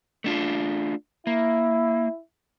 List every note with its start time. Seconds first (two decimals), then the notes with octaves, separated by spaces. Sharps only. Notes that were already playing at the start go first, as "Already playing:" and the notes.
0.24 A3 D4 F4
1.27 A#3 E4